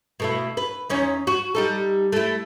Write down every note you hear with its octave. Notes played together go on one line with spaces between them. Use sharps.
B2 A3 E4
B4
E2 C#4 D#4
F#4
G3 D#4 A4
A3 E4